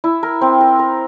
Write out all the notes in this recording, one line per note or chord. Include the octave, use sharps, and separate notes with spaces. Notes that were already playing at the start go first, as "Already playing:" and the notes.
E4
A#4
C4
A#4
A#4